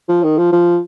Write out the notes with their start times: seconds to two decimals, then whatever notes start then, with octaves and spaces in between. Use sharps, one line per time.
0.09 F3
0.23 D#3
0.38 F3
0.52 F3